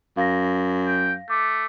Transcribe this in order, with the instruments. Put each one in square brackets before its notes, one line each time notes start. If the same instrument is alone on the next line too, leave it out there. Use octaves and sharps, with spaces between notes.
[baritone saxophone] F#2 [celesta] F5 A#6
[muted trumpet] G5
[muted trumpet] A3 [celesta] D6